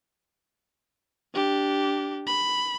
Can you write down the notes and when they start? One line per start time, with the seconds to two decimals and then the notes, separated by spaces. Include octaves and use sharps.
1.34 D4 G4
2.27 B5